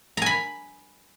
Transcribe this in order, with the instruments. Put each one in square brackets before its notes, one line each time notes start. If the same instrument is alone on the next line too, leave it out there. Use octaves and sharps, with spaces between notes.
[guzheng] A#5
G#5
B5